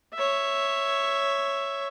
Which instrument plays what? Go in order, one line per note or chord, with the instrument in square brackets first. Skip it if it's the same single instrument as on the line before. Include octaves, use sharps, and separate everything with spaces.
[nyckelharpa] C#5 E5